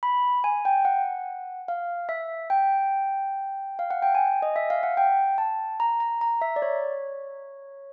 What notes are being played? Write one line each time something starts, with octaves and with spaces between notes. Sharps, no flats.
B5
G#5
G5
F#5
F5
E5
G5
F5
F#5
G5
G#5
D#5
E5
F5
F#5
G5
A5
A#5
A#5
A#5
E5
D5
C#5